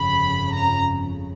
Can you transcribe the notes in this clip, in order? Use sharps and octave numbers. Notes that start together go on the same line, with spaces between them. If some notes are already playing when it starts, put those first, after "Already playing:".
Already playing: G1 F2 C#3 B5
A#5